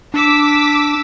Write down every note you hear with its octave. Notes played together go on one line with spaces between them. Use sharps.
D4 D6 E6 B6